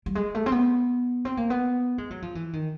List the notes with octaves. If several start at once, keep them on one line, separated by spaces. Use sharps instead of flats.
G3
G#3
A3
C4
B3
C4
A#3
B3
G#3
F#3
F3
E3
D#3